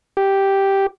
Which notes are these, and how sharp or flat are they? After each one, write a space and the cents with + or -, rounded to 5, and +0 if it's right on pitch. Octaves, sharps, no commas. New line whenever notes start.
G4 -5